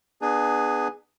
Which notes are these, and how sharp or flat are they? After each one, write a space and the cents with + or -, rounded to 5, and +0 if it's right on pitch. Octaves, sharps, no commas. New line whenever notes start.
B3 +0 D4 +40 G#4 +0